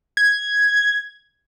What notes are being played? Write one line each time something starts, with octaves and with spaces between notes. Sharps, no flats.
G#6